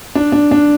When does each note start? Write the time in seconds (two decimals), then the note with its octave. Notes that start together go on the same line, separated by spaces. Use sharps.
0.15 D4
0.32 D4
0.51 D4